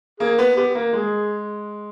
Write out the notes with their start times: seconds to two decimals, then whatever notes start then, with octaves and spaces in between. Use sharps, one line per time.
0.20 A#3 G#4
0.38 B3
0.56 B3 G4
0.75 A#3
0.93 G#3 G#4